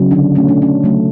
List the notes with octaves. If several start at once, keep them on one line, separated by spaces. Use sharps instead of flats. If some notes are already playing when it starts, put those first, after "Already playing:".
Already playing: C#3 F#3 B3
D3 D4
B2 A3 C#4
D4
C#4
C#3 F#3 A3